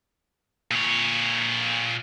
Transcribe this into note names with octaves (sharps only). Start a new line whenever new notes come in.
A#2 C#5